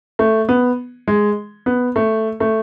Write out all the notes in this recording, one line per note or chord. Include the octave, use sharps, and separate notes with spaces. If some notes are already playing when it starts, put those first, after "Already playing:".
A3
B3
G#3
B3
A3
A3